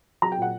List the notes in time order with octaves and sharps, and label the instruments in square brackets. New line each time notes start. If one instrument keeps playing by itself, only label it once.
[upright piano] F#3 A#5
G5
A#2 F#5